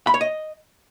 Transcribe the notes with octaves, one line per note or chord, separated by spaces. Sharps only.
B5
C#5
D#5